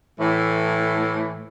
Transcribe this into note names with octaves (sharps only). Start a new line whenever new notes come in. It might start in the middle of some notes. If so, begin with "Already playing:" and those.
A2 E3